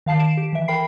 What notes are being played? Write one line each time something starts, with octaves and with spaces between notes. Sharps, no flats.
D#3 F5 A5 C7
D7 E7
G4
E3 E5
A#4 G5 B5 C7